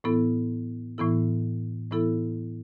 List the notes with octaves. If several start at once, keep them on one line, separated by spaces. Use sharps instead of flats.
A2 E3 B3 E4 A4
A2 E3 B3 E4 A4
A2 E3 B3 E4 A4